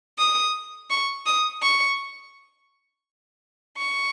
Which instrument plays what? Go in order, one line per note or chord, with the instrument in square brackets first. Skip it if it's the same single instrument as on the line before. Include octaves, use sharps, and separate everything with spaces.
[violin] D#6
C#6
D#6
C#6
C#6